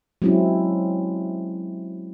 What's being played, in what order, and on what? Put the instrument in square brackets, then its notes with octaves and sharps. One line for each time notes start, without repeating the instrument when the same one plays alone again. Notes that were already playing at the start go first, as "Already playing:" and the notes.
[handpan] F#3 G#3 C4 C#4 E4